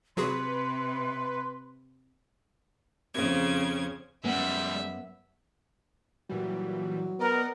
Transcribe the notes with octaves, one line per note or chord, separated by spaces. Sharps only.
C3 F#3 F#4 G#4 B4 C6
F2 C#3 C5 G#6
F#2 G3 G#3 B3 E5
A#2 E3 F#3 G3
B3 A#4 D5 D#5 F#5